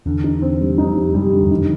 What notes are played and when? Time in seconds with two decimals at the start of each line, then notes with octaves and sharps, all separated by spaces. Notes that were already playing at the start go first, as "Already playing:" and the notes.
0.06 E2 D3
0.24 D#4
0.42 C4
0.60 G3
0.78 F2 D#4
0.96 G3
1.14 F#2 G3
1.33 D3
1.42 E2
1.51 F2 D#3